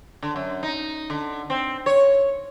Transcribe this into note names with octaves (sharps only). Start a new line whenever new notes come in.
D3
F#2
D#4
D3
C4
C#5